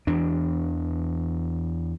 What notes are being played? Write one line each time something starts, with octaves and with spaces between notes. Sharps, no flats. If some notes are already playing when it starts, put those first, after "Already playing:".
E2 E3 D4